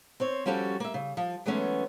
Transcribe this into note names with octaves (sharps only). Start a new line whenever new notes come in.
C4 C5 C#5
F3 G3 C#4 F#4 G4 A4
A#3 E5
C#3
F3
E3 F#3 G#3 A3 B3 C#4